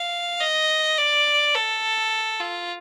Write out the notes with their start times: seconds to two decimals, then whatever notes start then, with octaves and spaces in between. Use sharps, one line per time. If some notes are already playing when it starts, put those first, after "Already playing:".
Already playing: F5
0.41 D#5
0.98 D5
1.55 A4
2.40 F4